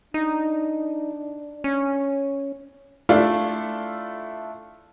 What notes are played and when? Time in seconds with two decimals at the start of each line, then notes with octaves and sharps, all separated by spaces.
0.14 D4 D#4
1.64 C#4
3.09 A3 D4 E4 F4 A4